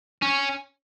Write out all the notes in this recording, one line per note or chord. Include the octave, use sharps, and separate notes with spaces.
C#4